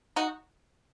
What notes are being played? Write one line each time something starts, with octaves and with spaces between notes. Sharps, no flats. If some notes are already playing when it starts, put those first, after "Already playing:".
D#4 F#4